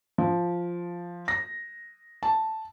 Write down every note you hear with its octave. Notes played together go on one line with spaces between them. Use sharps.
F3
A#6
A5